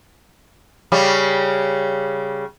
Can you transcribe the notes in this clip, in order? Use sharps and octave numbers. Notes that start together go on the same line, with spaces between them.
C#3 G3 C#4